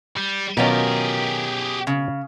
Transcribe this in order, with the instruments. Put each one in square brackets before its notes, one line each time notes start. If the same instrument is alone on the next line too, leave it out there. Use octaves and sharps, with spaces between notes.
[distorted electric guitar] G3
[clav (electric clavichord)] B2 F#3 C#4 [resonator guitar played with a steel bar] D#3 F4 A#4 [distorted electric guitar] G4 G#4
[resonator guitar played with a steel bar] C#3